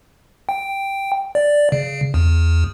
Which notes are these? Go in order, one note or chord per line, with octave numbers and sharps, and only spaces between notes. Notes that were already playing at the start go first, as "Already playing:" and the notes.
G5
D5
C#3
E2